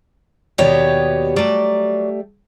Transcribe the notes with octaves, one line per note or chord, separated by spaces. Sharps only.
D#2 B2 B3 G4 C#5 D5
F#3 G3 A3 D5